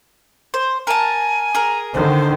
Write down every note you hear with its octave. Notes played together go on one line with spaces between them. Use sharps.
C5
A#4 G#5 A5
G#4 A#4
D3 D#3 C5